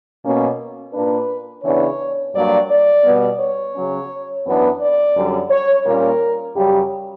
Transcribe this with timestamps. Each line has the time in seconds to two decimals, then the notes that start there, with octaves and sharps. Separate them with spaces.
0.24 B2 A#3 C#4
0.93 A#2 A#3 D4 B4
1.64 C#3 E3 B3 D4 C#5
2.34 G2 F#3 A#3 D5
2.69 D5
3.05 B2 G3 B3
3.40 C#5
3.75 C#3 F#3 C#4
4.45 F#2 E3 B3 D4
4.80 D5
5.16 F#2 D3 G3
5.51 C#5
5.86 A#2 G3 A#3 C#4 A#4
6.56 F#2 C#3 G3 G4